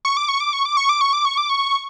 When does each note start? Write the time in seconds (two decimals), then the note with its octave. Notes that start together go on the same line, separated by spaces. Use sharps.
0.05 C#6
0.17 D6
0.29 C#6
0.40 D6
0.53 C#6
0.65 D6
0.77 C#6
0.89 D6
1.01 C#6
1.13 D6
1.25 C#6
1.38 D6
1.49 C#6